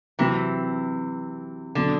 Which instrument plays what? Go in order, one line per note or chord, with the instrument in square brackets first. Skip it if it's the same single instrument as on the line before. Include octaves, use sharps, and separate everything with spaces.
[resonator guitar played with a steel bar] C3 E3 [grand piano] F#3 C4 F#4
[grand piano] B2 F#3 C4 F#4 [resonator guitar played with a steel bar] D3